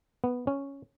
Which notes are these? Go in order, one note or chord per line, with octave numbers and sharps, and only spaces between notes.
B3
C#4